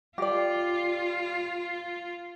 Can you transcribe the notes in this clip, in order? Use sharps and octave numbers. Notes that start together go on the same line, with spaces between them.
F4 G4 D5